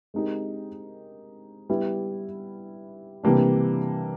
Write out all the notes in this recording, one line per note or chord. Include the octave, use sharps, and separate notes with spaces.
G#3 C4 D#4 G4 A#4
G3 B3 E4
C3 E3 G3 A#3 D4